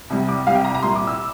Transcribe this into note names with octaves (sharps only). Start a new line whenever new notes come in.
C2 C3 G3
D6
C2 C3 G3 F5
G5
A#5
A#5
C2 A#2 G3 C6
D6
E6